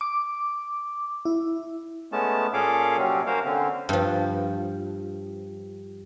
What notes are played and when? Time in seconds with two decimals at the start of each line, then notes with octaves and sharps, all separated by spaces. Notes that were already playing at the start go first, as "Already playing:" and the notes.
0.01 D6
1.25 E4
2.12 G#3 A3 B3 C#4 A5
2.53 A#2 C#4 G#4 A4 F5 D6
2.98 C3 F#3 G3 C4 C#4
3.27 A#3 C#4 F#4 A#4 C5 F5
3.45 D3 C4 C#4
3.89 G2 F3